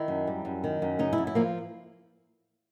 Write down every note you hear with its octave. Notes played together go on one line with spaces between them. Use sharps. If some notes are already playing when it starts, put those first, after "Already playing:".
Already playing: D#3 E4
F#2
G3
F#2
D#3
F#2
C#3 D#4
E4
F#2
E4
F3 A#3